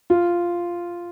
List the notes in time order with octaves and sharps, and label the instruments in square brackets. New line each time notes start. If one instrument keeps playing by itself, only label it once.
[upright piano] F4